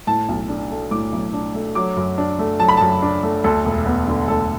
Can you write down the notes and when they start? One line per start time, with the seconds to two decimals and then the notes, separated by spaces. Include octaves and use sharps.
0.07 A2 A5
0.28 B1
0.49 D4
0.70 A3
0.91 A2 D6
1.12 B1
1.33 D4
1.54 A3
1.75 F#3 D6
1.97 F#2
2.18 D4
2.39 A3
2.60 F#3 A5
2.68 B5
2.77 F#2 A5
3.02 D4
3.23 A3
3.44 D2 A4
3.65 E1
3.86 B3
4.08 D3
4.28 D2 A4